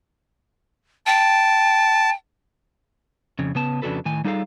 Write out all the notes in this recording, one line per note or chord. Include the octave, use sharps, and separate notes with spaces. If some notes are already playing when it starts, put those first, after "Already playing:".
G5 A5
F2 C#3
C#3 B3 A5
F2 C#3 D4 F#4 A4 B4
A2 D#3 G#5
G3 D#4 F4 G#4 A4 F5